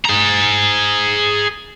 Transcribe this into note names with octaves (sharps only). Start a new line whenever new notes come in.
G#4 A#5